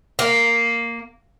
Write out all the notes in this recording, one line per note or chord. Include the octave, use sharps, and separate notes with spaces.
A#3